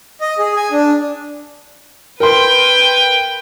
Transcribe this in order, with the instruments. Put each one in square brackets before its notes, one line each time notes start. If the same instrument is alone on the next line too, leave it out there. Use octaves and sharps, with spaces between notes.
[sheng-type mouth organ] D#5
G#4
G#5
D4
[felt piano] A#4 C6 [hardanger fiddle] B4 G5